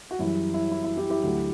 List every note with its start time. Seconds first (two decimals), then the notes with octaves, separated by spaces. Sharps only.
0.11 F#4
0.19 F#2 E3 G3 E4
0.54 E4
0.72 E4
0.84 E4
0.97 E4 G4
1.10 E4 G4
1.23 D2 D3 F#3